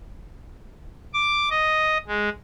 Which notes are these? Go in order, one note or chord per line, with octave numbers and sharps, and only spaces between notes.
D6
D#5
G#3